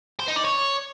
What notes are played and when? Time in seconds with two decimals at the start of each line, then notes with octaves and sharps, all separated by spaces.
0.20 C5
0.28 D#4
0.37 D5
0.45 C#5